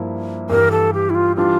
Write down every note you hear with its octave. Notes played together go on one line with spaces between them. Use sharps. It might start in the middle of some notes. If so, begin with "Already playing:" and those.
Already playing: G2 F3 A#3 E4
G2 E3 G3 A#4
A4
G4
E4
F4
E3 G3 D4 F4